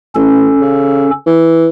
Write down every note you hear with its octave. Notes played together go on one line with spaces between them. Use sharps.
A1 C#4 A4
C#3
E3